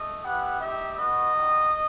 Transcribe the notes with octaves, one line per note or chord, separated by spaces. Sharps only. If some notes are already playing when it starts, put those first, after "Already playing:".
Already playing: A3 D#5
G3 B3 E4 G4 F#5
C4 D#4 G4 E5
B3 F#4 D#5
G3 D#4 F#4